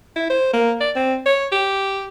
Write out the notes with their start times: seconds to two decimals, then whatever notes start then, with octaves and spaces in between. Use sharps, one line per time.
0.16 E4
0.30 C5
0.53 A#3
0.81 D5
0.96 C4
1.26 C#5
1.52 G4